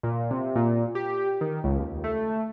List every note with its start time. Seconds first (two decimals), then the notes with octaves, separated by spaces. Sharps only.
0.03 A#2
0.31 C3
0.55 A#2
0.95 G4
1.41 D#3
1.64 C#2
1.79 D#2
2.04 A3